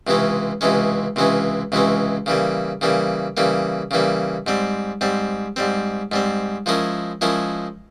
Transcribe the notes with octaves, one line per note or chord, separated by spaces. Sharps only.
C#2 C3 E3 G#3 C#4
C#2 C3 E3 G#3 C#4
C#2 C3 E3 G#3 C#4
C#2 C3 E3 G#3 C#4
C#3 E3 G3 A#3
C#3 E3 G3 A#3
C#3 E3 G3 A#3
C#3 E3 G3 A#3
G#2 G3 C4
G#2 G3 C4
G#2 G3 C4
G#2 G3 C4
F3 G#3 C#4 E4 A#4
F3 G#3 C#4 E4 A#4